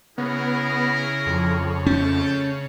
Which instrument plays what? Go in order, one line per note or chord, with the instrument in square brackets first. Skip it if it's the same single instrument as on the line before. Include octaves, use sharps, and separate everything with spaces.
[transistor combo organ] C#3 [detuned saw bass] B3 [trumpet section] E4 G#4 A#4
[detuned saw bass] F2
[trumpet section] A3 G5 A5 [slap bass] C#4